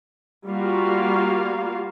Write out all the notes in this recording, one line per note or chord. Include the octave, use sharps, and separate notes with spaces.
G3 A#3 F4 F#4 F5